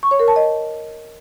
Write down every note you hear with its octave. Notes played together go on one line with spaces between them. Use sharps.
C#6
C#5
A#4
A5
D#5